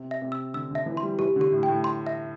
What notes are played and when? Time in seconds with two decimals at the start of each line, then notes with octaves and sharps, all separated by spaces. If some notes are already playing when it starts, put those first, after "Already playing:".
Already playing: C3
0.11 E5
0.22 C3
0.32 E6
0.54 D3 E6
0.71 D3
0.75 E5
0.86 E3
0.97 C6
1.03 G3
1.19 E3 G4
1.36 D3
1.41 G4
1.52 A2
1.63 G5
1.68 A2
1.84 C6
2.07 E5